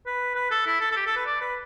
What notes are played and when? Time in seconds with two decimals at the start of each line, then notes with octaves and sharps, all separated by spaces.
0.06 B4
0.35 B4
0.51 A4
0.66 E4
0.81 A4
0.91 A4
0.96 G4
1.06 A4
1.16 B4
1.26 D5
1.41 B4